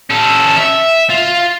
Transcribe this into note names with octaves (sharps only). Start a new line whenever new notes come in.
C#4 A4
E5
F4